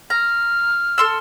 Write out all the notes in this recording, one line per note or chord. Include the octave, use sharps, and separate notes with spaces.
A#5 F6
A4 C6 E6